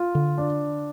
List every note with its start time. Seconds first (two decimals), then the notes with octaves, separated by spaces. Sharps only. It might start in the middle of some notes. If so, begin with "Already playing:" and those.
Already playing: F4
0.15 D3
0.38 D4